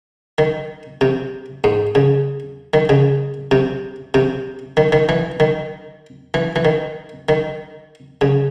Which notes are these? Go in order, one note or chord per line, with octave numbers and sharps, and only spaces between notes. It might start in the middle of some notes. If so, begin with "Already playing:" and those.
D#3
C3
G#2
C#3
D#3
C#3
C3
C3
D#3
D#3
E3
D#3
E3
E3
D#3
D#3
C#3